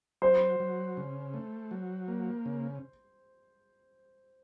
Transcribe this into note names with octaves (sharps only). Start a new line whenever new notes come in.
F#3 C5
F#3
C#3
A3
F#3
A#3
C#3